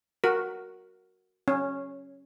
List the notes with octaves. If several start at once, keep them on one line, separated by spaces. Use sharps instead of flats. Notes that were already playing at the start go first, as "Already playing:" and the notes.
F#4 A#4
C#4